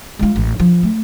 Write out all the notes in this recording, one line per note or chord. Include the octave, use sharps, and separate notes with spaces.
G#3 F4
A1
F3
A3